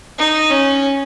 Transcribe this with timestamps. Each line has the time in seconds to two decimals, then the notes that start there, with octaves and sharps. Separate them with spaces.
0.18 D#4
0.50 C#4